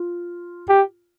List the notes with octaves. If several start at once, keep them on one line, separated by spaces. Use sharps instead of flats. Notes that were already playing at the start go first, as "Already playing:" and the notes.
Already playing: F4
G4